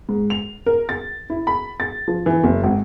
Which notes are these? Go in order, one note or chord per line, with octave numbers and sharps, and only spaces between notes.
G#2
F7
A#4
A6
E4
B5
A6
F3
E3
F#1
G#1